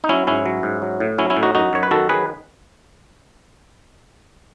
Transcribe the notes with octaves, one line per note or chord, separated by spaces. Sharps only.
D#4
F#3 C#4 E4
G#2 C#4 E4
F#3
G#2
F#3
A2
F#3 C#4 E4
C#4 E4
A2
D#4 F#4
F#2 D#4 F#4
F#2 C#5
B4
D#3 F#4 A4
F#3 G#4 B4